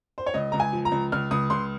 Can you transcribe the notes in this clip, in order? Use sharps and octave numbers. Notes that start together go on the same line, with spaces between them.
C5
C#5
C#2 D#5
C#2 A#5
G#5
F3
A#5
C#2
C#2 F6
C#2 D#6
C#2 C6